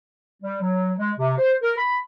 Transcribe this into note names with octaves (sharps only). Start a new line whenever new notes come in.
G3
F#3
G#3
C3
C5
A#4
B5